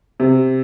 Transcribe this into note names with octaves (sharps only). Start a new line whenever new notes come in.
C3